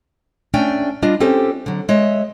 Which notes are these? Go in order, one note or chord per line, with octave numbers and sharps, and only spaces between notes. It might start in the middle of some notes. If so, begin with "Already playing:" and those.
A3 C#4 D4 G5 G#5
G3 D4 F4 D#5
C4 C#4 G4 A4 C5
D3 F#3
G#3 C#5 D#5 E5